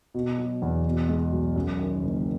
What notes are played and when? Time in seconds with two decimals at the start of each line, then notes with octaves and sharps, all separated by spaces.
0.14 B2
0.38 F#3
0.62 E2
0.85 B2
1.09 G#3
1.32 B1
1.56 F#2
1.79 D#3
2.03 F#1